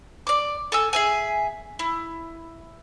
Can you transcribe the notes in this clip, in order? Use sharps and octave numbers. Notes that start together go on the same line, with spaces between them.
D5 D6
A4 G#5 E6
G#4 E5 G#5
E4